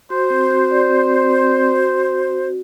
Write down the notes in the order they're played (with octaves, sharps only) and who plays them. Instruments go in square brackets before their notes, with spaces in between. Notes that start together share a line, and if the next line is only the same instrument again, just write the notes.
[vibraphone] F#4 [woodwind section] C5
[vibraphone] C4
F#4
D5
C4
C4
C4
C4
F#4